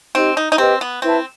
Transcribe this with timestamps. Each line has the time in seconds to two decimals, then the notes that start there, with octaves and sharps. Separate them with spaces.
0.15 C4 D#4 G4 D#5
0.37 D#4
0.52 D#4
0.58 C4 G4 B4 D#5 G5
0.81 B3
1.02 C4 E4 B4 E5 A5